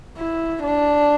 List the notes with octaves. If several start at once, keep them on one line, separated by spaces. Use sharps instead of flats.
E4
D4